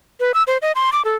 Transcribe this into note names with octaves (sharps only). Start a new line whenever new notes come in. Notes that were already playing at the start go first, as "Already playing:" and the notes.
B4
E6
C5
D#5
C6
D6
A4